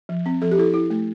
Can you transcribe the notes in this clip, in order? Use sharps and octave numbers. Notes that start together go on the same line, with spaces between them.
F3
C4
F3 A4
G4
E4 A4
E4
A3